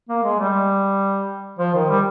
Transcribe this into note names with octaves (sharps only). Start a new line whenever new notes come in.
A#3
G#3
G3
F3
D#3
G3